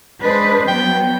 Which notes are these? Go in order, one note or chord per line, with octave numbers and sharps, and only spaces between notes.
G#3 D4 B4 C5
F#3 B3 G5